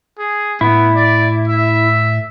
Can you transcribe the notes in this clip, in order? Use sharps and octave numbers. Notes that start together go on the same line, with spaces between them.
G#4
A2 B3 E4
D5
E5